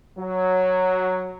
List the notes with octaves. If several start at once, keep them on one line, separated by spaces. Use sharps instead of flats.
F#3